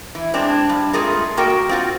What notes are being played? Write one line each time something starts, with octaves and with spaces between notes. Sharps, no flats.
E3
G#3 C4 D4
G2
G#3 A3 C4 F4 G#4 A#4
G#2 A#3 F#4 A#4 G5
C4 F4 F#4